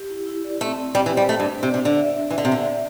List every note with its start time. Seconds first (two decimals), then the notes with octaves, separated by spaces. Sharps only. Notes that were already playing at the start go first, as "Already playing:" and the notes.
Already playing: G4
0.10 E4
0.26 E4
0.44 D5
0.61 A3 C4
0.78 C4
0.95 G3 G4
1.06 E3
1.12 C5
1.17 G3
1.29 A3 D5
1.40 G2
1.46 D4
1.63 C3 D5
1.74 C3
1.80 D4
1.85 D3
1.96 E5
2.13 E5
2.30 E3 E5
2.38 D3
2.45 C3
2.48 D3 E5
2.65 E5